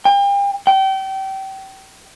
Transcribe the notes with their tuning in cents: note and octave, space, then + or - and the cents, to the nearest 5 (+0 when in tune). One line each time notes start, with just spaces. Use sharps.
G5 +40
G5 -30